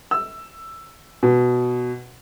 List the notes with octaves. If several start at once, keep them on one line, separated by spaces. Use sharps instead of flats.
E6
B2